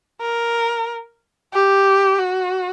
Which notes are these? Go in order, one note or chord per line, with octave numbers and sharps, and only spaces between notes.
A#4
G4
F#4